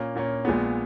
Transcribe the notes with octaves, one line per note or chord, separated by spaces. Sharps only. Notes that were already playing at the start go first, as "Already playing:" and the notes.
Already playing: A#2 A#3 C#4
A#2 A#3 C#4
A#1 A#2 G#3 B3